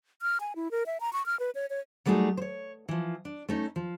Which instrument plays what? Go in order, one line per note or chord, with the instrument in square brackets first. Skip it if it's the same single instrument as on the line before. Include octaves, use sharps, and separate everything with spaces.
[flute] F6
G#5
E4
A#4
E5
A#5
C#6
F6
B4
C#5
C#5
[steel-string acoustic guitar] F#3 G3 A3 D#4 G4 G#4
C5 C#5
E3 F3
D4
A3 C#4 D#4
F3